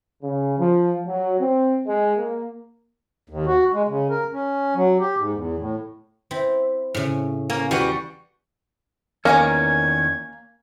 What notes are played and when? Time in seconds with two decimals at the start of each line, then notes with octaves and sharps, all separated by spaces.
0.23 C#3
0.58 F3
1.06 F#3
1.40 C4
1.86 G#3
2.17 A#3
3.29 D#2
3.46 F#4
3.74 G#3
3.88 C#3
4.10 A#4
4.33 C#4
4.75 F#3
5.00 G4
5.18 G#2
5.33 E2
5.59 A2
6.31 C4 E4
6.94 A2 C#3
7.50 A#3 C#4
7.71 E2 G3 F#4 F5 G#5
9.25 E2 D#3 A#3 C#4 C#5 G#5 A#5 G#6